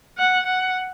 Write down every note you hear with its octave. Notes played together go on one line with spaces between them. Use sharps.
F#5
F#5